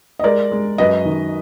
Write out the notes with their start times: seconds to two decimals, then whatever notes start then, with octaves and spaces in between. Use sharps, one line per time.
0.19 D#5
0.23 G#3 A#4 D5
0.52 G#3
0.78 F#2 B4 D#5
1.05 D#3